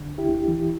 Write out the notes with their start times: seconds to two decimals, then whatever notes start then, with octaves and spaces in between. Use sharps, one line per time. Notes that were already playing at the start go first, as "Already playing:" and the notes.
Already playing: D3
0.08 D2
0.18 E4 G4
0.28 D2
0.48 E3